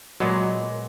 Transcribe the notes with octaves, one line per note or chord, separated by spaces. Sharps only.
A#2 F#3 G#3 B3